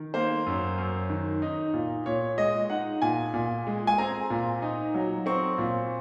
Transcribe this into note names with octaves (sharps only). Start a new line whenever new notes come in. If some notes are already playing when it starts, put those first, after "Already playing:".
Already playing: D#3
A#3 C5
F#2
F#2
D#3
D#4
A#2
A#2 C#5
G#3 D#5
D#4 F#5
A#2 G#5
A#2
G#3
G#5
C4 A#5
A#2
D#4
F#3
C4 C#6
A#2